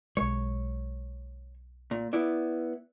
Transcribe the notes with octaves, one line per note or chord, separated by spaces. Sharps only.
B1 G#3 C#5
A#2
B3 E4 D5